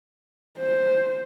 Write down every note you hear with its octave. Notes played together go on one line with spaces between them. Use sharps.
C5